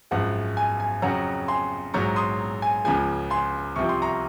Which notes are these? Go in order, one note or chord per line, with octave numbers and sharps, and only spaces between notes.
G#1 F#2 F3 G#3 F#5
G#5
G#5
F2 C#3 F#3 F#5 A#5
G#5 C6
A#1 G#2 F#3 A#5 C#6
C6 D#6
G#5
C#2 C#3 F3 G#3 G#5
G#5 C6
C2 C3 F3 C#6
C6
A#5 C#6